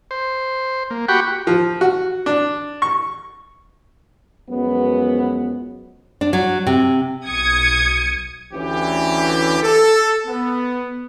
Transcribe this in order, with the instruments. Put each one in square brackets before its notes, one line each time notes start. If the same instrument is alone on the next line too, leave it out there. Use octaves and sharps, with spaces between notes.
[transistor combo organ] C5
A#3
F#4 G4 F#5 G5 B5 C#6
[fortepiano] F3
F#4
D4
C#6
[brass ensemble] F#2 F3 F#3 G#3 B3
[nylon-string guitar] D4
F#3
C3
[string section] B1 D#6 G#6 C#7
[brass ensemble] D2 E3 C#4 G4
A4
B3